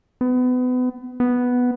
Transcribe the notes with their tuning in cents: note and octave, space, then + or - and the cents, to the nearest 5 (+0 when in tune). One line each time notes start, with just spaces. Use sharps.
B3 +30
B3 +0